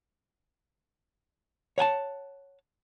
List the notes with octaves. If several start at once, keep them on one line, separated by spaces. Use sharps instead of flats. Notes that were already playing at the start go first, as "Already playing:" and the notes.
C#5 F#5 G#5 A5